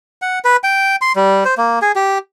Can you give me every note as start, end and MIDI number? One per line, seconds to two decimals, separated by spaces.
0.22 0.39 78
0.45 0.56 71
0.64 0.96 79
1.01 1.12 84
1.16 1.44 55
1.45 1.54 72
1.57 1.79 58
1.82 1.92 68
1.96 2.18 67